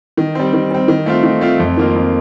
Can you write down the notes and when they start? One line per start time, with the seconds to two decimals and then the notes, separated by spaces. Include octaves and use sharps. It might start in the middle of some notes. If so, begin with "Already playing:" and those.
0.17 D#3
0.35 G3 C4
0.53 D#3
0.71 G3 C4
0.88 D#3
1.06 A3 C4 F4
1.23 D#3
1.41 A3 C4 F4
1.59 F2
1.77 D#3 A#3 F4
1.95 F2